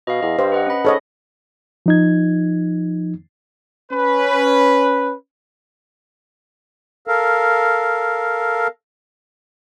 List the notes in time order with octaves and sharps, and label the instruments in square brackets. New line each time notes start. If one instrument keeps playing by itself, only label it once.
[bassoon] B2 [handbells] D#5 F5
[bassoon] E2 [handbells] D#5
[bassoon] G2 [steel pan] C5
[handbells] B4 D#5 F#5
C#4 B5
[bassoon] G#2 [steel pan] A4 C#5 D#5
[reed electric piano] F3 D#4 G#6
[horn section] C#4 B4
[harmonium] A4 A#4 F5